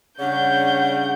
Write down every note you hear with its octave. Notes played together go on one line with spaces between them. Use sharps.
C#3 G3 D4 C#5 F#5 G6